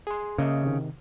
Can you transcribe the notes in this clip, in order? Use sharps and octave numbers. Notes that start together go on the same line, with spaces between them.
G#4 C6
C#3 A#3 D#5 E5
C3 D#3